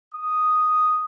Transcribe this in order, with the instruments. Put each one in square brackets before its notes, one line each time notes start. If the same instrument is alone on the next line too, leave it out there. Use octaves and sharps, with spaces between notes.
[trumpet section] D#6